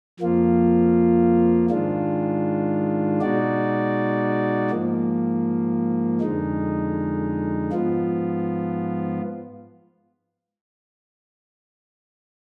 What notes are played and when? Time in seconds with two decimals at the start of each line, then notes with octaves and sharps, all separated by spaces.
0.20 F2 F3 A#3 F4
1.70 G#2 D#3 G#3 D4 F4
3.21 B2 G#3 D#4 F#4 D5
4.70 G#2 F3 A#3
6.20 F2 D3 G#3 D#4
7.71 G#2 F3 B3 F4